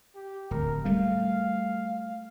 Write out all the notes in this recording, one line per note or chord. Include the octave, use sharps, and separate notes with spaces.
G4
D1 A#4
G3 A3 F5